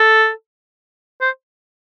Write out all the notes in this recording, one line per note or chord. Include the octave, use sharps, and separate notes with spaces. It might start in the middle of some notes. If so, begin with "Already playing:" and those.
Already playing: A4
C5